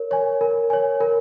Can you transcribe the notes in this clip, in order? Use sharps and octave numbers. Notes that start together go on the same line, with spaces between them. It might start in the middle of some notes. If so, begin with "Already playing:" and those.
Already playing: A#4 C#5
C#5 G#5
A#4
C#5 G#5
A#4